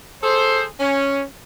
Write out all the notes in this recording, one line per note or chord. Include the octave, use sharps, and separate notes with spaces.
G#4 A4 C5
C#4